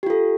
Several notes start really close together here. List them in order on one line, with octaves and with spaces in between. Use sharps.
G4 F4 A4